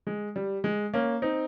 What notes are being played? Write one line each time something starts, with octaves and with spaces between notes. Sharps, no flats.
G#3
G3
G#3
A#3 C#4
C4 D#4